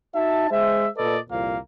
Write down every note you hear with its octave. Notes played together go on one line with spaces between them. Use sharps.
D#4 F#4 E5 A5
G#3 C5 E5
A#2 A4 B4 D5 D#5
C2 F2 A#2 A#3 F5